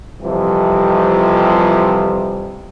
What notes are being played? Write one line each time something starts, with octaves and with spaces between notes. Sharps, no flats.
F2 C3 E3 F3 G3